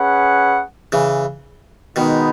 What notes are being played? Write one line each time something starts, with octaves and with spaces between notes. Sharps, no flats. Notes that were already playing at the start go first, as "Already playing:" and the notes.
Already playing: C#4 G#4 B4 F#5
C#3 E3
B2 D#3 G#3 B3 D#4